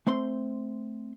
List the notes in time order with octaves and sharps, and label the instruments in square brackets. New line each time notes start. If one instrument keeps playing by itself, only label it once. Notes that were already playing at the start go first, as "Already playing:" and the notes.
[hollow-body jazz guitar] A3 C4 C5 C6